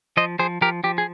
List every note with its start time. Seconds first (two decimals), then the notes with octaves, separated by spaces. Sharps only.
0.17 F3 C5 D#5
0.39 F3 G#4 C5
0.61 F3 G4 A#4
0.84 F3 G4
0.98 G#4